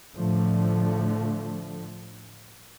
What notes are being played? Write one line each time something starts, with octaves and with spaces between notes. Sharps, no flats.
A2 D3 F3 A3